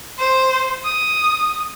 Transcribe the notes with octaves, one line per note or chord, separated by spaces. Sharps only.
C5
D#6